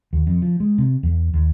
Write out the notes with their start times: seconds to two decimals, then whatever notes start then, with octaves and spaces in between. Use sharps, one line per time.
0.13 D#2
0.27 F2
0.42 F3
0.60 G#3
0.78 C3
1.03 E2
1.34 D#2